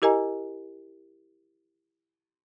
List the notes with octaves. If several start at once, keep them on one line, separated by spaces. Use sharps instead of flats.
E4 G4 A#4 D#5 G#5 A#5